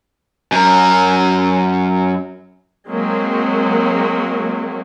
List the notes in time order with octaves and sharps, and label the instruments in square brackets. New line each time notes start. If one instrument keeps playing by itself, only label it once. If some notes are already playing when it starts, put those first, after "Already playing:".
[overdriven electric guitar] F#2 A#4
[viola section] F#3 G#3 A#3 C4